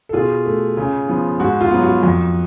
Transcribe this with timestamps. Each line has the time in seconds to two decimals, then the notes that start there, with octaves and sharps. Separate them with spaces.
0.09 A4
0.13 B2 F4 G#4
0.46 A3
0.77 C#3
1.08 F3 B3
1.40 G#2 F#4
1.61 F4
1.71 F#3 B3
1.82 F#4
2.03 F2